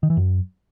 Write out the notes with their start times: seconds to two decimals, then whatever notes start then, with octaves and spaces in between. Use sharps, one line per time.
0.03 D#3
0.10 E3
0.17 F#2